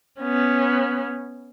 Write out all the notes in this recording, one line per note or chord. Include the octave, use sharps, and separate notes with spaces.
B3 C#4